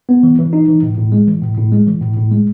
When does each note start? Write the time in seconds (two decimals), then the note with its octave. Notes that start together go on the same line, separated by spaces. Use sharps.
0.09 B3
0.23 E3
0.38 E3
0.53 D#4
0.68 E3
0.83 A2
0.98 A2
1.12 G#3
1.28 E3
1.42 A2
1.57 A2
1.72 G#3
1.86 E3
2.02 A2
2.17 A2
2.31 G#3